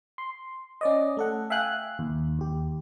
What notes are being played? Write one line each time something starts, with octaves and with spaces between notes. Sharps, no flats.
C6
C#4 D5 D#5
A3 A4 F#5
E5 F5 G5 G#5 F#6
D#2
D#2 G4